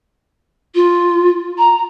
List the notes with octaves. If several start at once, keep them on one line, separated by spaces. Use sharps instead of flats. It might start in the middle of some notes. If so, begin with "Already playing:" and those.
F4
A#5